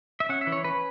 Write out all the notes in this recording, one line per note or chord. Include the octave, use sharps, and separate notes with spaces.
E5
C#4 F#5
E5
E3
C#5
C#4 B4